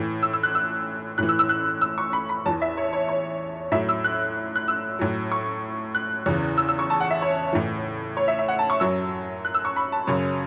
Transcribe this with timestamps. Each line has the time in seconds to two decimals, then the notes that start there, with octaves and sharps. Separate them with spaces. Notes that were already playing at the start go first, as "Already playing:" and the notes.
Already playing: A2 E3
0.23 E6
0.33 E6
0.43 F#6
0.55 E6
1.18 A2 E3 F#6
1.29 E6
1.39 E6
1.49 F#6
1.82 E6
1.98 C#6
2.13 B5
2.29 B5
2.46 E2 E3 A5
2.62 E5
2.77 C#5
2.93 C#5
3.09 C#5
3.72 A2 F#3 E5
3.89 E6
4.04 F#6
4.56 F#6
4.68 E6
4.99 A2 F#3
5.32 C#6
5.95 F#6
6.26 E2 C#3 E3
6.58 E6
6.69 E6
6.79 C#6
6.90 A5
7.01 F#5
7.11 E5
7.22 C#5
7.53 A2 E3
8.17 C#5
8.28 E5
8.39 E5
8.48 F#5
8.59 A5
8.70 C#6
8.80 F#2 F#3 E6
9.45 F#6
9.55 E6
9.65 C#6
9.76 B5
9.92 A5
10.07 F#2 C#3 F#3 C#5